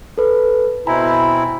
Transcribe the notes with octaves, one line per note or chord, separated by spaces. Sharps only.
A4 B4
B2 C4 E4 G#5 A#5 B5